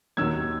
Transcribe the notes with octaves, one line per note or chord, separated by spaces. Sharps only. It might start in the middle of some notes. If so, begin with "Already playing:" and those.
D#2 D#3 F#3 E6 G#6